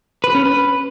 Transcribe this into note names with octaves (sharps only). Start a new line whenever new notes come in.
B4
C#4
B4